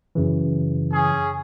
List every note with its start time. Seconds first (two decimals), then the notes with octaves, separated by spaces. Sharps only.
0.15 F#2 C#3 E3
0.93 C#4 G#4